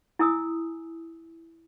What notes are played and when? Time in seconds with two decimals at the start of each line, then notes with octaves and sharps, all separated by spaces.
0.19 E4 G#5 D#6 E6